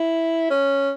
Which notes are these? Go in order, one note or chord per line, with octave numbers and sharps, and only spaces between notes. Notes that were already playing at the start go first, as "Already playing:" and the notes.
Already playing: E4
C#4